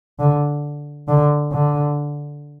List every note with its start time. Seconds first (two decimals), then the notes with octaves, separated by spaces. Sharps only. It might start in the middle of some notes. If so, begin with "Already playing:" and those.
0.19 D3
1.08 D3
1.52 D3